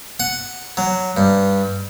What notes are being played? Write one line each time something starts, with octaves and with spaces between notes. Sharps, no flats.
F#5
F#3
G2